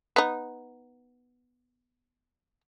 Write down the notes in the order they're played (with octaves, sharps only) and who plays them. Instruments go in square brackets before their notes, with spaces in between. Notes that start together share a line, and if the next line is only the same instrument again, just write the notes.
[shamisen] B3 D#4